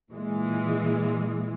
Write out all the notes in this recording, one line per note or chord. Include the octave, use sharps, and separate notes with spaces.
A#2 E3 G#3